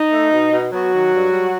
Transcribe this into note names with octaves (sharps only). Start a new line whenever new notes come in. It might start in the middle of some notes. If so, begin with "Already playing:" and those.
Already playing: D#4
A3
B2
B2
F#3 B3 F#4
D#3
G2
G3